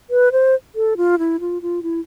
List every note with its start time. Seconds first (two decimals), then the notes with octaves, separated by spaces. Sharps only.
0.10 B4
0.32 C5
0.75 A4
0.97 F4
1.19 E4
1.40 F4
1.62 F4
1.83 E4